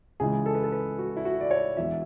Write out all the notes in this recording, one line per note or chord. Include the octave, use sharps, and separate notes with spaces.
C#2 C#3 E3 G#3 G#4
A4
B4
A4
B4
F#4
E4
F#4
D5
C#5
E1 E2 B2 F#3 E5